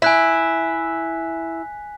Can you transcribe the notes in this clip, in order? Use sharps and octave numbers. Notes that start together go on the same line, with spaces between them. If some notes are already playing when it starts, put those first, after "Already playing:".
E4 G#5 F#6 B6